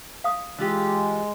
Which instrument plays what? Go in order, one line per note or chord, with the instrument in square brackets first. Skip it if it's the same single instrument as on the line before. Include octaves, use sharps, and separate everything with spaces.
[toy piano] F5 D#6
[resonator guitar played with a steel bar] E3 F4 G4 [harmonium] G#3